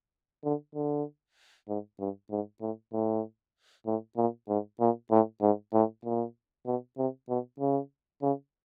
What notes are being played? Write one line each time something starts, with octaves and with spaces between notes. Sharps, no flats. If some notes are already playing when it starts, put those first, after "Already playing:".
D3
D3
G#2
G2
G#2
A2
A2
A2
A#2
G#2
A#2
A2
G#2
A2
A#2
B2
C3
B2
C#3
C#3